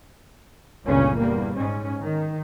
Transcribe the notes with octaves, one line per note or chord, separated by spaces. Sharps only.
G1 C#2 A#2 C#3 C#4
E2 G3 A#3
G#2 C#4
D#3